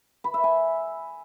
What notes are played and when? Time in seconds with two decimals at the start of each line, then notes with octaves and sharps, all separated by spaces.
0.24 B5
0.34 E5
0.44 G#5